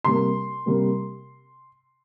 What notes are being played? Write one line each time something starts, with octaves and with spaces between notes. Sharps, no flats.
C3 G3 A#3 C6
C3 G3 A#3